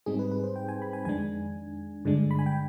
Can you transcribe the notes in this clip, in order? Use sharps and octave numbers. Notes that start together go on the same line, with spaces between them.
G#2 G3 C4 D#4 G#4
B4
B4
C5
G5
G#5
B5
G#5
F2 D#3 G#3 D4 G#5
G2 D3 G#3 D4
B5
G#5
G5